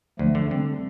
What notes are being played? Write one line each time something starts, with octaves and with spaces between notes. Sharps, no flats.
D2 F3 A3
D3
D3 G3 C4